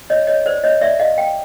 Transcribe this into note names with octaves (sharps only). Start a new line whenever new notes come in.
C#5 D#5
C#5 D#5
C5 D5
C#5 D#5
D5 E5
D#5 F5
F5 G5